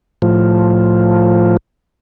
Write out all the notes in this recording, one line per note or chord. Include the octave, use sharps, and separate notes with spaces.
A2 F3